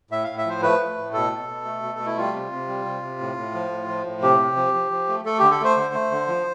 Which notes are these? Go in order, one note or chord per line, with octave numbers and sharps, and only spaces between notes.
A2 E5
A2 F5
E5
F3 C5
A3 B4
A3
A2
B2 A4
B2
B2
A3
B2
A3
E4
G3 F4
C3
C3
G3
C3
C3
A2
A2
F3
A2
F3
A2
C3 G4
C3
F3
F3
F3
A3
A3 A4
D3 G4
A4
A3 C5
D3
A3
D3
F3